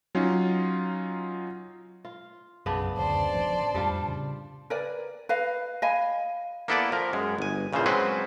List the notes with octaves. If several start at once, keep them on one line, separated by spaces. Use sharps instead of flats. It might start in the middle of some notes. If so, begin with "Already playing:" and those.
F#3 C#4 D#4 F4
F4
B1 F#2 C#3 B3 D4
F#1 D2 C5 D5 A5
A1 F3
F2 A2 G3 D4 F4
C#3
A#4 B4 D5 G#5
B4 D#5 F5
D#5 F5 G#5 B5
A#3 B3 E4 A4 B4 D5
F3 A#4
F#2 G#3
G1 G#5
A#1 C#3 E3 F3 C5
F#3 G#3 C4 C#4 B4 C5